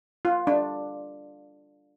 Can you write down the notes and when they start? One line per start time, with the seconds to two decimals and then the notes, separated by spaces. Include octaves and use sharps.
0.25 F4
0.47 D4